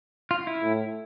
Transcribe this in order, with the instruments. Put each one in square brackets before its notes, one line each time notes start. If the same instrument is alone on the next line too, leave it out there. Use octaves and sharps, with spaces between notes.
[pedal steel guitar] F4
E4
[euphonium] A2